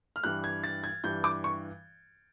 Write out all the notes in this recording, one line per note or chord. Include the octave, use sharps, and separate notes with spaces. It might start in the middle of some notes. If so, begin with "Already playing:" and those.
F6
G2 E3 G3 F#6
G#6
A6
G#6
G2 E3 G3 G6
D6
C#6